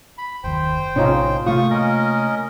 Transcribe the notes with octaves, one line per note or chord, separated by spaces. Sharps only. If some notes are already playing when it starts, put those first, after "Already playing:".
B5
F#1 D#2 D#3 C5 G5
A#1 A2 C3 C#4 D#4 F4
C3 A3 A#3 F4 C#6 D#6
C#4 A#4 D#5